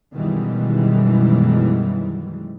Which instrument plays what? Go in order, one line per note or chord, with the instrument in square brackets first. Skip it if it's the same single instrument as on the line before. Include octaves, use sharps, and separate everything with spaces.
[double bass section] F#2 B2 D#3 E3 G3 G#3